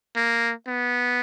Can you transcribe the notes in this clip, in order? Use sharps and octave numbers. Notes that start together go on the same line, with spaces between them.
A#3
B3